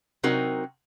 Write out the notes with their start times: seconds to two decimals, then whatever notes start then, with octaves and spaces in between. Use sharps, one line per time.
0.23 C3 F#3 C4 D#4 F#4 A#4